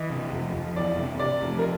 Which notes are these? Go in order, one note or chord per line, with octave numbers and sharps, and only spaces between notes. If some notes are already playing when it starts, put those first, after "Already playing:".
Already playing: E3 D#5
C3
F2
F2
E3 D5
C3
C3 D5
F2
A#4